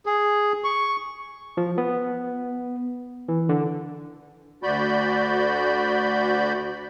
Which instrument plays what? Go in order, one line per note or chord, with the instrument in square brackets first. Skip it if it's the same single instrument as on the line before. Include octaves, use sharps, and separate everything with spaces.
[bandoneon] G#4
C#6
[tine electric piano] F3
B3
E3
D3
[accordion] D2 F#4 D5 B5 G6